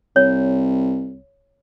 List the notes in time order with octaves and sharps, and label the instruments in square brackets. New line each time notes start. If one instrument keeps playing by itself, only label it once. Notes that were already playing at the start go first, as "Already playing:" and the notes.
[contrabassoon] C2 [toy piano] C#5